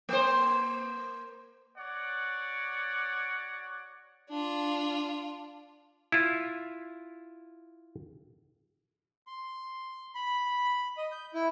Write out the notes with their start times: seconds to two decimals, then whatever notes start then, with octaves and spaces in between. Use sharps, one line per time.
0.09 A#3 C5
1.78 F#4 C#5 D5 F#5
4.30 D4 F4
6.12 E4 F4
9.27 C6
10.15 B5
10.98 D#5
11.12 G6
11.34 E4